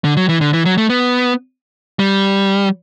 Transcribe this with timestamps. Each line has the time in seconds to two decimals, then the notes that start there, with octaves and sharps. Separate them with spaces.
0.04 D3
0.17 F#3
0.29 E3
0.41 D3
0.53 E3
0.65 F#3
0.78 A3
0.90 B3
1.99 G3